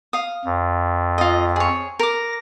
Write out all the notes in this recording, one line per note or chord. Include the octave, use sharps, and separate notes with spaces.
F5 D#6
F2
F4 D#5
G#4 C#5
A#4 D6 A#6